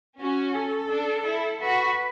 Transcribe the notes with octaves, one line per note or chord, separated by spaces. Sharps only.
C#4 F#4
A4
D4
E4
F#4 B4